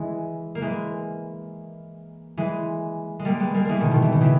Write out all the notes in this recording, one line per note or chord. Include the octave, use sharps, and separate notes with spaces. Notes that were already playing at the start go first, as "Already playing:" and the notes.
Already playing: E3 G#3
A#3
E3 G#3
E3 G#3
G#3
G3 A#3
G#3 B3
G3 A#3
E3 G#3 A#3
B2 D#3
B2 D#3
E3
D#3
C#3 E3